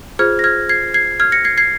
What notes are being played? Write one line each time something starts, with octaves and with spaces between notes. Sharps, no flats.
F4 G#4 C5 F6 G#6
A#6
F6 G#6
G#6 C7
G#6 C7
F6 G#6
A#6 C#7
G#6 C7
G#6 C7